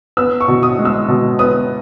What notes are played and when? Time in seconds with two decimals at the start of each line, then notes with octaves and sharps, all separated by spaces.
0.17 B3 E6
0.41 C#6
0.48 B2
0.63 D#6
0.79 G#3
0.85 E6
1.08 B2
1.39 B3 D#6